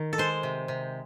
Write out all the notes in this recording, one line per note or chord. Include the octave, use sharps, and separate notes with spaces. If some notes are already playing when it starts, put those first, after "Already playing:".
Already playing: D#3
A4
G#3 C5
C3
C3